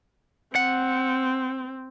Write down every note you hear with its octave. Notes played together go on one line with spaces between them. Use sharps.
C4 F#5